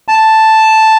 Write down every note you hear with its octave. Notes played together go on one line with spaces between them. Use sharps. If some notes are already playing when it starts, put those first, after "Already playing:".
A5